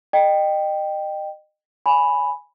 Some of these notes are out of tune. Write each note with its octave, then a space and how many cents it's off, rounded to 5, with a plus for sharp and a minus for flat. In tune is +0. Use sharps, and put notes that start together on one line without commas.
D#5 -30 G5 +0
C#5 +35 G#5 +0 B5 +0